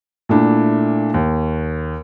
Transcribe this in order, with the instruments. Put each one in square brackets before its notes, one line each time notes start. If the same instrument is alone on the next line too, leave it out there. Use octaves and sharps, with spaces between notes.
[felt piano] A#2 A3 D4 E4
D#2